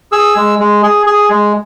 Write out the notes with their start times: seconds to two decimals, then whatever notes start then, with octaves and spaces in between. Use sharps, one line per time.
0.12 G#4 E6
0.36 G#3
0.59 G#3
0.83 G#4
1.06 G#4
1.30 G#3